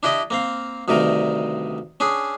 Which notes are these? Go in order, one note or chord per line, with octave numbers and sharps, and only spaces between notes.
D4 E4 G4 D5 D#5
A#3 C4 F5
D2 G2 C3 D#3 A#4
C#4 D4 G#4